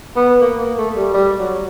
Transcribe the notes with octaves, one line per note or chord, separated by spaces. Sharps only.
B3
A#3
A#3
A3
G3
G3
F#3